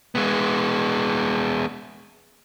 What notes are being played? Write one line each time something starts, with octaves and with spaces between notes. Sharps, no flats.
G#3 B3